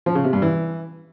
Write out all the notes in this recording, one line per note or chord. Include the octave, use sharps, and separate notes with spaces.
F3
C#3
C3
G2
E3